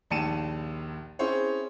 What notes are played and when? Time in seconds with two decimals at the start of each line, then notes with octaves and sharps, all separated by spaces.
0.10 A#1 D#2 A5 C#7 D#7 E7
1.19 C4 C#4 E4 G#4 C5 C#5